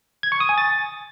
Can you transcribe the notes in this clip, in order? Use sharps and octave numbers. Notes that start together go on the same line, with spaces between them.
G#6
C#6
D#6
G#5
A6